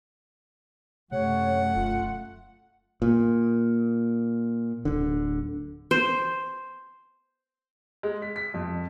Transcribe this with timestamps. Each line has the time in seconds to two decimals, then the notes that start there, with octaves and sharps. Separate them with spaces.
1.12 F#2 C3 A3 C#5 F#5
1.75 E1 F4
3.02 A#2
4.85 D1 D3
5.91 C5
8.03 G#3
8.22 B6
8.36 B6
8.54 F2